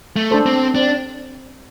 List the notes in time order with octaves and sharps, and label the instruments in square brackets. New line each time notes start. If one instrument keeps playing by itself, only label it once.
[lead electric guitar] A3
[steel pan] D4 A4 C5
[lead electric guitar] C4
[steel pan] C4 [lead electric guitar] D4